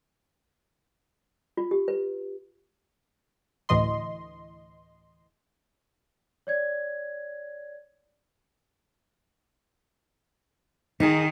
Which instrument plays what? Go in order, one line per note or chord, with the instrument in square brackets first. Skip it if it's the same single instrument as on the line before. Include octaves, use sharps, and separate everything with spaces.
[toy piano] F4
G4
B4
[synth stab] D2 A2 E3 D#5 C6
[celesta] C#5 D5 G#6
[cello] D#3 [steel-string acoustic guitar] D#4 G#4